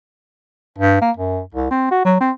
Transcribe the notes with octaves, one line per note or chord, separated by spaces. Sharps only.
G2
A#3
F#2
C2
C4
F#4
F#3
C4